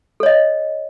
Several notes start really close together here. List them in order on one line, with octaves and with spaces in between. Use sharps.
A4 C#5 D#5